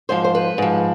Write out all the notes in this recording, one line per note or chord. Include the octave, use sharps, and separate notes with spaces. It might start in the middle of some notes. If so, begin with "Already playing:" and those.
G#2 F3 C5
C5
B4
G#2 F3